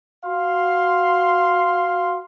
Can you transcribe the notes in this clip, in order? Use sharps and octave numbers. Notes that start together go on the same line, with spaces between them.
F#4 F5 C6